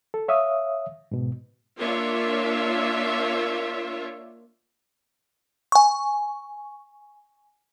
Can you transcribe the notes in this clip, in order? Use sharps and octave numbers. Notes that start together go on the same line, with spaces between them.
A4
C#5 E5 F5 D#6
G#2 B2
A#3 D4 F4 C#5 E5
G#5 C#6